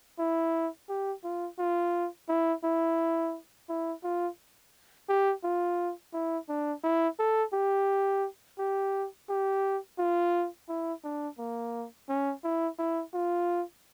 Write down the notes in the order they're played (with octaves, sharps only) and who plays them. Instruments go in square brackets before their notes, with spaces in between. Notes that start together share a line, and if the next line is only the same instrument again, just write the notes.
[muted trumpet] E4
G4
F4
F4
E4
E4
E4
F4
G4
F4
E4
D4
E4
A4
G4
G4
G4
F4
E4
D4
A#3
C#4
E4
E4
F4